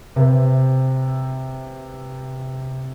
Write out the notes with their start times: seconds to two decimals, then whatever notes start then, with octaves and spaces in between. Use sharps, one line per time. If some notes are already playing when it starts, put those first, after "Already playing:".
0.16 C3 C4 B4 C5 E5